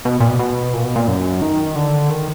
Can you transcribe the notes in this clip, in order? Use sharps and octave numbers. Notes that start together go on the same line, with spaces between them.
B2
A#2
B2
B2
A#2
B2
A#2
F#2
D#3
D3
D#3